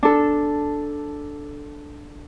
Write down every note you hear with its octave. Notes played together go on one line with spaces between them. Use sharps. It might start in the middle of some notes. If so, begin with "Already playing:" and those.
D4 A4